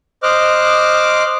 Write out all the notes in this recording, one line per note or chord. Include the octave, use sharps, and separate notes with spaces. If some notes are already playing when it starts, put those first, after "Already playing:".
C5 D#5 D6 F6 F#6